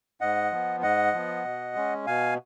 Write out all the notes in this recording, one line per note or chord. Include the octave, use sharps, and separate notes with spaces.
G#2 D#5 F#5
F3 B3
G#2 D#5 F#5
F3 B3
B2
G#3 C#4
B2 F5 G#5